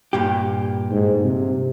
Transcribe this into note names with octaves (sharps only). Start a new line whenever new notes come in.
G2 A#2 G4
G#2
C3